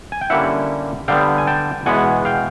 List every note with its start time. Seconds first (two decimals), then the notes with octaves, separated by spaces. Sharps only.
0.12 G#5
0.21 G5
0.30 D3 G3 A#3 C#4 E4 E5 F#5
1.08 D3 G3 B3 F5 G5
1.38 G#5
1.47 G5 A5
1.86 E2 B2 G#3 B3 F#5 G#5
2.25 F5 G5